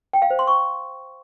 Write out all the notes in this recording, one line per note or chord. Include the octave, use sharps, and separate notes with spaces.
G5
F5
C5
C6
C#6